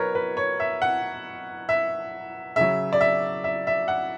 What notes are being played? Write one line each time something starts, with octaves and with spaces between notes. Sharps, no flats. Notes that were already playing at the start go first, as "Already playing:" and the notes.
Already playing: B2 F#3 A#4 B4 C#5
B4
C#5
E5
F#5
E5
C#3 F#3 E5
D5
E5
E5
E5
F#5